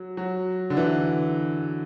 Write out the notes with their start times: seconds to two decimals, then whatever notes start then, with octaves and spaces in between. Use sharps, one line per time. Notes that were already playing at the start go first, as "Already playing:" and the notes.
Already playing: F#3
0.17 F#3
0.70 D3
0.77 E3